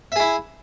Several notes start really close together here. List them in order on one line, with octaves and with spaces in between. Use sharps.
E5 G#4 E4